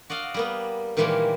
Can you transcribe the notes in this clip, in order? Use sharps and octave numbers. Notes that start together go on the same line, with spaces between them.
F#4 D5 D#5 F5
G3 A#3 B3
A#2 D#3 E3 G3 G#3 A#3